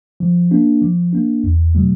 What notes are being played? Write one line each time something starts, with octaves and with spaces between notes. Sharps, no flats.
F3
A#3 D4
F3
A#3 D4
E2
B2 F#3 A3